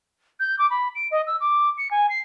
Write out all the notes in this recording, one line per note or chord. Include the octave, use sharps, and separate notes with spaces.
G6
D6
B5
D7
D#5
E6
D6
C#7
G#5
C7